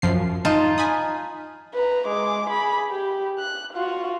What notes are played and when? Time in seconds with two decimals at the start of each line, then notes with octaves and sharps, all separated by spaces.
0.02 F#2 F3 C7
0.45 D#4 F4 A5
0.78 G#5 B5 D#6
1.74 B4 A#5
2.07 G#3 D6
2.50 G#4 B5
2.90 G4
3.39 F#6
3.73 F4 F#4